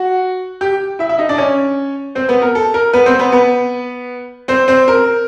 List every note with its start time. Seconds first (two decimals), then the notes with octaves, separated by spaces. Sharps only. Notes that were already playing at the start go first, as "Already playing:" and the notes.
Already playing: F#4 F#5
0.61 G4 G5
0.99 E4 E5
1.09 E4 E5
1.18 D#4 D#5
1.29 D4 D5
1.38 C#4 C#5
2.15 C4 C5
2.28 B3 B4
2.42 A#4
2.55 A4
2.74 A#4
2.93 B3 B4
3.06 C4 C5
3.19 B3 B4
3.32 B3 B4
4.48 C4 C5
4.68 C4 C5
4.88 A#4